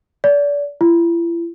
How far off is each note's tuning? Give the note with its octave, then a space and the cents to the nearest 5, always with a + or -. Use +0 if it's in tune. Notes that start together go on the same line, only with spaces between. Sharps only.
D5 -30
E4 +40